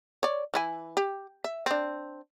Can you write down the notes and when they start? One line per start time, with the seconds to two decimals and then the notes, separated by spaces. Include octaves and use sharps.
0.23 C#5 D5
0.54 E3 E4 G#5
0.97 G4
1.44 E5
1.66 C4 D4